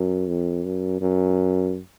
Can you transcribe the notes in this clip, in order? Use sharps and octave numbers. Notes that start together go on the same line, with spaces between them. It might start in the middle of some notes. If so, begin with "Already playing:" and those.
Already playing: F#2
F2
F#2
F#2